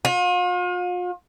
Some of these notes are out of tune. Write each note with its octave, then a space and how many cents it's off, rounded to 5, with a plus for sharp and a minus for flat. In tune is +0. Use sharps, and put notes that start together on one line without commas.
F4 +40